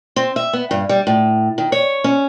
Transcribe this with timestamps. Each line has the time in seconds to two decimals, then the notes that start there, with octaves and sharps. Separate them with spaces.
0.16 C4
0.36 E5
0.53 B3
0.71 G2
0.89 G3
1.07 A2
1.58 D#3
1.72 C#5
2.04 C#4